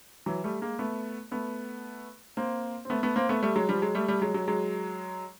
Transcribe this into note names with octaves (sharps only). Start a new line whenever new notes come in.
E3 F#3
G3 A3
G#3 A#3
A3 B3
A3 B3
A#3 C4
C4
A3 B3
A3 B3
A#3 C4
A3 B3
G3 A3
F#3 G#3
F3 G3
F#3 G#3
G3 A3
G3 A3
F#3 G#3
F#3 G#3
F#3 G#3